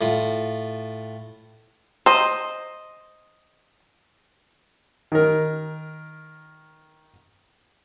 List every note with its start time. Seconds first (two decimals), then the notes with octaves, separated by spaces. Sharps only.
0.01 A2 F4
2.06 C5 D#5
5.12 D#3 A#4